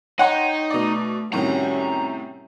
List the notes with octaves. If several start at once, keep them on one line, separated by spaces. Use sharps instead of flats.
D#4 C#5 F#5 G5 C6
B2 A3 D5
A2 C3 D#3 G3 C#4 F#4 A#5